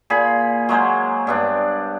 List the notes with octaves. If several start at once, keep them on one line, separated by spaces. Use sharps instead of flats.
A#2 G#4 B5
F#3 G#3 A#3 C5
G2 B3 D4